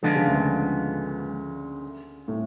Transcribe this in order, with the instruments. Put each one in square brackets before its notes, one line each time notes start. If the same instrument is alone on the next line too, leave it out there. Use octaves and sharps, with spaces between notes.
[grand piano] D3 [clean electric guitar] F3 G#3 B3 D4 F4
[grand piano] C#3
D2 D3
A2